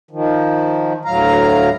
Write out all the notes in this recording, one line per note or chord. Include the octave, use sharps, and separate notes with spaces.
D#3 F3
D2 A2 F#3 F5 A#5